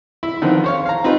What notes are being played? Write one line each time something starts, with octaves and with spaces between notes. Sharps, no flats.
E4
D3 D#3 F3 B3 C4
C5 C#5 F5
F5 A#5
C4 D#4 F4 G4 B4